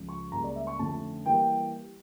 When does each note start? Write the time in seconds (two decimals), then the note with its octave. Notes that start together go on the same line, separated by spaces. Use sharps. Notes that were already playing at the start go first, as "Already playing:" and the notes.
Already playing: C#2 C#3 F3
0.09 C#6
0.32 C#2 C#3 G3 A#3 A#5
0.44 D5
0.55 E5
0.67 C#6
0.79 F2 D3 A3 C#4 A5
1.26 E3 G3 A#3 G5